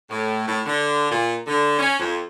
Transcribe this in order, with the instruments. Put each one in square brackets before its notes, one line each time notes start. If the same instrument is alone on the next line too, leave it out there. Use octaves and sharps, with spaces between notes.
[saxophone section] A2
A2
D3
A#2
D3
C#4
F2